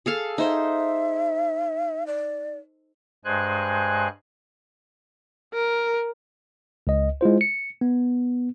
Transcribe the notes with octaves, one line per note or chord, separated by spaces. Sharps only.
G#4 A4 F5
D#4 C5 E5
D5
G2 G#3 C5 G#5 F#6
A#4
C#2 D#5
G#3 E4 F4 C5
C#7
B3